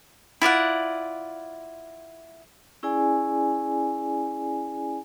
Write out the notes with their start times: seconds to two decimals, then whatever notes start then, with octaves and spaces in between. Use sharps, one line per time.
0.42 E4 F4 D5 F#5
2.83 C#4 E4 G#4 D5 G#5